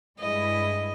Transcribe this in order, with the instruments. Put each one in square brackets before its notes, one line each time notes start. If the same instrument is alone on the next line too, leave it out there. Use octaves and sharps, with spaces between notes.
[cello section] G2 G#3 E4 [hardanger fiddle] D#5